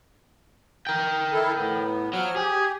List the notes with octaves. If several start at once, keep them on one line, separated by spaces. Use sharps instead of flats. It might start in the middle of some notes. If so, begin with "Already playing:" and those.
A#4 G5
E4 A4
A2 B3
F3 F#3 F6
G4 G#4